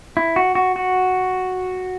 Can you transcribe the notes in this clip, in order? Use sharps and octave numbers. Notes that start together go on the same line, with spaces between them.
E4
F#4
F#4
F#4